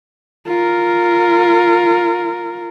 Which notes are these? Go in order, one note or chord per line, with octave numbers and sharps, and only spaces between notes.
F4 A#4